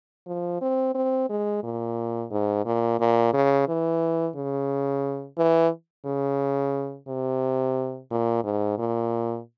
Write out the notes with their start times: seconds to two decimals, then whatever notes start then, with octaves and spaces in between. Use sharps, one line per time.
0.27 F3
0.61 C4
0.95 C4
1.30 G#3
1.63 A#2
2.31 G#2
2.65 A#2
3.00 A#2
3.33 C#3
3.68 E3
4.35 C#3
5.38 E3
6.05 C#3
7.08 C3
8.11 A#2
8.44 G#2
8.78 A#2